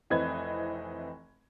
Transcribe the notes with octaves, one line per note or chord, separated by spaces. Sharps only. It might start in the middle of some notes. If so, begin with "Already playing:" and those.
F1 E3 C4 B4 D#5 G#6